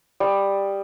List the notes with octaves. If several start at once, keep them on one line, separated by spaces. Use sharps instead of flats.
G3 D#6